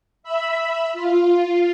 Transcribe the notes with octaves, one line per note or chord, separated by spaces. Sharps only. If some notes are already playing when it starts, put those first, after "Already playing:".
E5 B5
F4